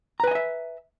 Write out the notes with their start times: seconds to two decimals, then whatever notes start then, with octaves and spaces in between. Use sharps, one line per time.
0.20 A#5
0.24 B4
0.27 G#5
0.31 D#5
0.35 E5